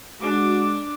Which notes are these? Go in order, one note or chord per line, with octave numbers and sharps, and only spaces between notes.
G#3 D4 F#4 D6